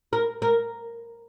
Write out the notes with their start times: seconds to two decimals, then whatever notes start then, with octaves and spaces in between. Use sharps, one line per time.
0.13 A#4
0.42 A#4